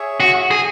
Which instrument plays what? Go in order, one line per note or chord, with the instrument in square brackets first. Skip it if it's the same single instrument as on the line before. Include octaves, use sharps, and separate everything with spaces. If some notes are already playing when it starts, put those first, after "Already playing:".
Already playing: [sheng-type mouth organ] G#4 C#5 E5
[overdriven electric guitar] F#4
G#4